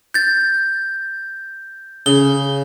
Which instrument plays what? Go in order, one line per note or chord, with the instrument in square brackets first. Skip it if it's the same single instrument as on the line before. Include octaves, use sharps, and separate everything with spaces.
[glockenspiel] G6 A6
[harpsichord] C#3 [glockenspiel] G7